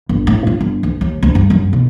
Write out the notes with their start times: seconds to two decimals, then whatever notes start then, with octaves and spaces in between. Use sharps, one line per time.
0.09 G1
0.27 A2
0.47 F4
0.61 G1
0.83 D2
1.01 D#2
1.23 D2
1.35 G2
1.50 F#2
1.73 B2